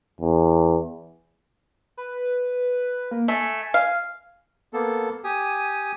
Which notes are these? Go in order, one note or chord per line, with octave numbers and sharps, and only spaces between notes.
E2
B4
A#3
A3 G#5
F5
A#3 B3 A4
G4 G#5 D#6